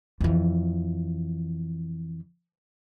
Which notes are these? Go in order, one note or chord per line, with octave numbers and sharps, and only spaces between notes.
F2 E3